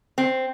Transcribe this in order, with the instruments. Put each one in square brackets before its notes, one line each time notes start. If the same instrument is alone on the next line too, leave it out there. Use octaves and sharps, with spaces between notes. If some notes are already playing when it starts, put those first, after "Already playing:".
[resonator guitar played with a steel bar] C4